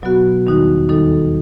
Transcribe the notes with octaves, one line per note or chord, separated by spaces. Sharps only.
B2 F#3 B3 F#4
E2 D#3 G3 D#4 F#4
D#2 D#3 G3 D#4 A4